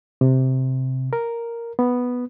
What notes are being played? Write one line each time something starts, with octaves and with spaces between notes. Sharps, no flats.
C3
A#4
B3